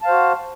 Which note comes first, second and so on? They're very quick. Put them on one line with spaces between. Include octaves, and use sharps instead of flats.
A5 F5 C5 F#4